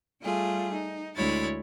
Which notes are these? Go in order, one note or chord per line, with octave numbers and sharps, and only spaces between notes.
G3 A3 F4 G#4
D#4
D2 G#3 E4 C#5 B5 A6